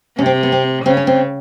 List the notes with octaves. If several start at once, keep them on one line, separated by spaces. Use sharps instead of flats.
C3 C#4
C4
B3
C4
C#3 C4
C#4
C4